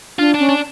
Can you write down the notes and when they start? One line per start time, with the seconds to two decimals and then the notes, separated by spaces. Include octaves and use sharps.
0.19 D4 F4
0.34 D4
0.39 C#4
0.49 D4